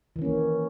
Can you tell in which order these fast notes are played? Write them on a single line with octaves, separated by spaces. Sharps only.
E3 D#3 C#4 A#3